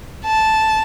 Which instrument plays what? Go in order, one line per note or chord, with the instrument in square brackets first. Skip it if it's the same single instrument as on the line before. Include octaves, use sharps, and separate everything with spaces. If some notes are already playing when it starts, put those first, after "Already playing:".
[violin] A5